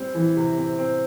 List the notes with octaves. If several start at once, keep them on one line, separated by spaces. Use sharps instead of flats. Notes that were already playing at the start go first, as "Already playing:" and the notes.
Already playing: G3 C4
E3
C3
C4
C4